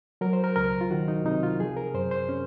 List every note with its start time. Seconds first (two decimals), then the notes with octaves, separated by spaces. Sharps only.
0.21 F#3 A#4
0.33 C5
0.44 A#4
0.56 C#2 A#4
0.81 F4
0.91 D#3 F#4
1.08 D#4
1.25 C3 D#4
1.43 F4
1.60 F3 G#4
1.77 A#4
1.94 F#2 C5
2.11 C5
2.29 C#4